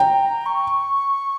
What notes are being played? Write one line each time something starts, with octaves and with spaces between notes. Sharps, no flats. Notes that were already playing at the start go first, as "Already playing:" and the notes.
Already playing: G5 A#5
C#6